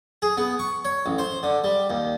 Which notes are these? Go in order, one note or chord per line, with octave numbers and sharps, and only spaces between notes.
G#4
B3
C#6
C#5
A1
C5
D3
G3
D#2